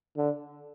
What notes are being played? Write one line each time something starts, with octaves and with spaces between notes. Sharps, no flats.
D3